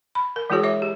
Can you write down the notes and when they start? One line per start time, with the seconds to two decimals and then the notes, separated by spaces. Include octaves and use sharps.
0.15 B5
0.36 A#4
0.50 E3 G#3 E4 F#4 G#4 C#5
0.64 C#5 E5 D6
0.82 G4